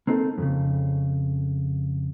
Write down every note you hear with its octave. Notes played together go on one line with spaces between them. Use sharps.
A#3 C4 D#4 A4
F2 A2 C#3